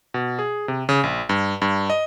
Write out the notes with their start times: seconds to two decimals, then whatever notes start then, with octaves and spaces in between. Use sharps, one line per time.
0.14 B2
0.39 G#4
0.68 C3
0.89 C#3
1.03 A#1
1.29 G2
1.62 G2
1.90 D#5